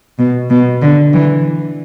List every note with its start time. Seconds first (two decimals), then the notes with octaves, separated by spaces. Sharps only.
0.19 B2
0.50 B2
0.82 D3
1.14 E3